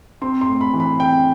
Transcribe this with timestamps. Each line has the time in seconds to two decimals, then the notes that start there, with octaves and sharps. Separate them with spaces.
0.22 C4 C6
0.41 C6
0.48 A2
0.61 B5
0.74 E3
0.80 B5
1.00 C4 G5